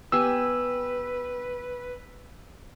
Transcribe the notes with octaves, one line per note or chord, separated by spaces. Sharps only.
B3 G4 B4 G#5 E6